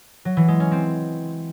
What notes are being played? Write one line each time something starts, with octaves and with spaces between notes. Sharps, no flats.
F#3
E3
G#3
C#4
C4